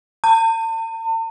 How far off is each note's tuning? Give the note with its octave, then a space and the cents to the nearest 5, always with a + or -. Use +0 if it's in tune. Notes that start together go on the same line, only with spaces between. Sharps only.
A5 +45